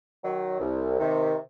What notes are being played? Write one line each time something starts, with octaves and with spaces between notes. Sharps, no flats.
D#3 F#3
C2
C3 D#3